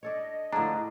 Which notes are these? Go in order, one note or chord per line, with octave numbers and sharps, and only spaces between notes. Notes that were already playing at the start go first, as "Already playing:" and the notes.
D4 A4 C#5 D#5
A2 D3 F3 D4 G#4 A#5